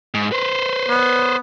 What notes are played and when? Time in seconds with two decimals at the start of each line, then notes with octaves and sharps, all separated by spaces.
0.14 G#2
0.32 B4 C5
0.88 B3